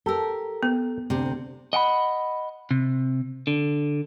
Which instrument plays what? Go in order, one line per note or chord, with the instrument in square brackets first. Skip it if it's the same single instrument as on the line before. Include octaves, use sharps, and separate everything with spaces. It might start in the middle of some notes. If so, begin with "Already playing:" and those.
[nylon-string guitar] G4 A#4 [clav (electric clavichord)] A4
[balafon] B3
[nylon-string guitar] D2 C3
[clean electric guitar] D#5 F#5 G5 B5
C3
D3